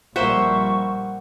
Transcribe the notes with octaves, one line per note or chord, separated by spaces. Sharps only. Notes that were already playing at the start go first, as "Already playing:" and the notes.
A#1 G3 A#3 C5 E5 F#5 C#6